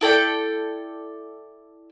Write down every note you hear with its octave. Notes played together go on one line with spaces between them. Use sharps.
E4 A4 D5 G5